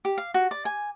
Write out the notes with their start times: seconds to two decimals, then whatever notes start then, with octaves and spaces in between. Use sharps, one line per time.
0.05 G4
0.18 F5
0.34 F#4
0.51 D5
0.65 G#5